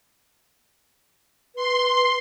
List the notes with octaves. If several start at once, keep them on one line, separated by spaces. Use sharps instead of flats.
B4 C6